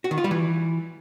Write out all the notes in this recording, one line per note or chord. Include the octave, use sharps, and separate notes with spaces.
F#4
D#3
F4
G3
E3